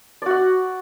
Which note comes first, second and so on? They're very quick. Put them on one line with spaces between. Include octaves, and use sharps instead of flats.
D5 F#4 F#5